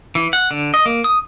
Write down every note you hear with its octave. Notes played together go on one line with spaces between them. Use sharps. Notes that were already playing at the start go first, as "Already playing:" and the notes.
E3
F#5
D3
D#5
A#3
D#6